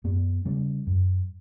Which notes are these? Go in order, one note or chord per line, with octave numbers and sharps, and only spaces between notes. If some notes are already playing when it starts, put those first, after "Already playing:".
F#2 B3
C#3 G3
F#2